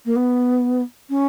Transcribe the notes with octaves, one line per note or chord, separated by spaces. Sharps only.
A#3
B3
C#4